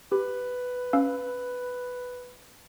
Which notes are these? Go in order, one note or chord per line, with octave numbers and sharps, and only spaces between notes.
G4 B4
C#4 F5 E6